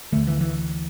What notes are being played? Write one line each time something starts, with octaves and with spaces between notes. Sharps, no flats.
D2 D3 A3
E3
E3